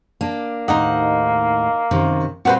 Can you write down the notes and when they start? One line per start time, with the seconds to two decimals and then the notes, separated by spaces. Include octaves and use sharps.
0.21 A#3 D4
0.68 D#2 A2 A#3 D#4 C5 D#5 F#5
1.91 F#2 C3 D#3
2.45 A#2 G3 C4 F#4 B4 C5